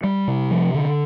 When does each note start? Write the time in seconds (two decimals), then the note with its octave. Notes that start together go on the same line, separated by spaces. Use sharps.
0.04 G3
0.28 C3
0.51 F3
0.74 D3